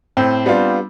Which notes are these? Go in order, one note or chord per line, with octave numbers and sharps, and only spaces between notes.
A2 C4
G3 B3 D4 F4